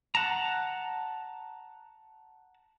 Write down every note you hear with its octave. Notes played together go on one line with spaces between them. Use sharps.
F#5 A5 A#5